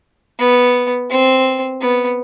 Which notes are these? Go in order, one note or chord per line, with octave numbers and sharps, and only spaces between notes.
B3
C4
B3